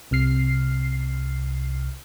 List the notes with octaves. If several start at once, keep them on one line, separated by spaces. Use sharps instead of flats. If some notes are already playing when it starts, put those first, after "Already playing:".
C2 C3 F6 C7